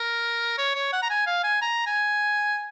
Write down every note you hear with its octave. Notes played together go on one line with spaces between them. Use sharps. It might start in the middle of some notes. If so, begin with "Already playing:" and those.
Already playing: A#4
C#5
C#5
F#5
A#5
G#5
F5
G#5
A#5
G#5